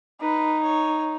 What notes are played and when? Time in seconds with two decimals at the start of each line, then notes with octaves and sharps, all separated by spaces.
0.20 D#4 B4
0.63 C#5